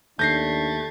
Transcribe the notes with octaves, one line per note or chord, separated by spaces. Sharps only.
D#2 A3 D4 G6 A#6 C7